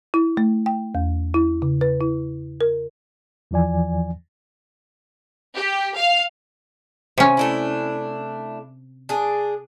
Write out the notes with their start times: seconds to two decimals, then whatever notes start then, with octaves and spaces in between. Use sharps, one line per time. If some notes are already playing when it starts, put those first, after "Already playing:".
0.14 E4
0.37 A3
0.66 G5
0.95 E2
1.34 E4
1.62 C#3
1.81 B4
2.01 E4
2.61 A#4
3.51 E2 E3 F3 D5 G#5
5.55 G4
5.95 F5
7.18 C3 C#4
7.37 A3 D4 E4
9.09 D4 G#4